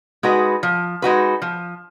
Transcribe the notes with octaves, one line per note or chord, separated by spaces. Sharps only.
G#3 D#4 F#4 B4
F3
G#3 D#4 F#4 B4
F3